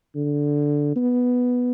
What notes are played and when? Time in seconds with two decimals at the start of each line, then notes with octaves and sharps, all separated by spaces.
0.16 D3
0.96 B3